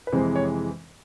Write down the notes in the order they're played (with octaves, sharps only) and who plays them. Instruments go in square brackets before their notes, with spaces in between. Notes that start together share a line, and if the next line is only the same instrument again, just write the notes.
[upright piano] B4
F2 C3 E3 G#3 C5
C#5